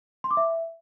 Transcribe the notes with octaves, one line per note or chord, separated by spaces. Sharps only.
C6
D6
E5